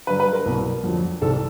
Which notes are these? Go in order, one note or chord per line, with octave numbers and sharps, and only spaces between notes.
G2 D3 F#3 B4
B4
A#4
C2 B2 F#3
F2 D3 F#3
C2 C3 D#3 G3 A4